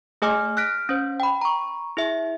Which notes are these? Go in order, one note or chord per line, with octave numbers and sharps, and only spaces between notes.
A3 G#4 D#5 G#5 D6 F6
F6 F#6 A#6 B6 D7
C#4 C5
G5 B5
A#5 C#6
E4 G#4 E5